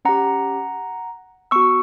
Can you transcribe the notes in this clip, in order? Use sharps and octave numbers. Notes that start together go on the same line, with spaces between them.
C#4 G4 F#5 A#5
B3 F#4 C#6 E6